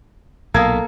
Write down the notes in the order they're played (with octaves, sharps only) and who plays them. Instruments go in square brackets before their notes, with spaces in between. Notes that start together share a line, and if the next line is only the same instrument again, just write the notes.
[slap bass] B1 A#2 [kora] A#3 [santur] A4 [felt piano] F5 D#6 G#6